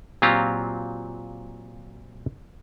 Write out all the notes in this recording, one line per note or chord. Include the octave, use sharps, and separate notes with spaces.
A#2 F#3 C4 F4 G4 A#5